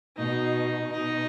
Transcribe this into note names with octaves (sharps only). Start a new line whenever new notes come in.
B2 D#4
B2 D#4